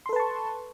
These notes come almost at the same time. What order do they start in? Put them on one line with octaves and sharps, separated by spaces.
C6 A4 B4 A5 C#6